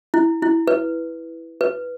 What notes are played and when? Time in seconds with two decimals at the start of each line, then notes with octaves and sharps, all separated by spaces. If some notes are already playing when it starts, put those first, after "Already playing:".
0.14 E4
0.42 E4
0.67 B4
1.61 B4